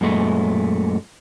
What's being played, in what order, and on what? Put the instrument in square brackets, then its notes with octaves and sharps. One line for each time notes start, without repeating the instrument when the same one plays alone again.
[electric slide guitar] F#2 A#2 G#3 A3